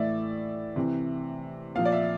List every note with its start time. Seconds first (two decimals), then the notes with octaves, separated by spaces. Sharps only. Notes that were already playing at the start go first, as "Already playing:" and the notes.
Already playing: A2 E3 D5 E5
0.76 C3 E3
1.75 A#2 F3 F5
1.85 D5
1.92 E5